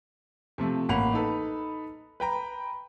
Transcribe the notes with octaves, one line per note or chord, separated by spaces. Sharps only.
C3 F3 A3
A1 A#3 F#5 B5 F7
D#4 A4 B4
B4 G5 A#5